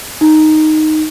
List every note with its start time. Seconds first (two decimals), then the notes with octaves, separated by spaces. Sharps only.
0.21 D#4